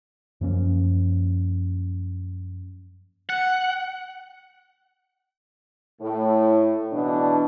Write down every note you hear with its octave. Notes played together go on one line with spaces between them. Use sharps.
F#2 F3 A#3 C#4
F#5
A2
B2 E3 D4